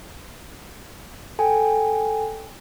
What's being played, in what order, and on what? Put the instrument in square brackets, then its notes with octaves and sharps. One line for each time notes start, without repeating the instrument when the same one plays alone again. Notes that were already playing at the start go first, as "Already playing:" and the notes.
[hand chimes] A4 G5 G#5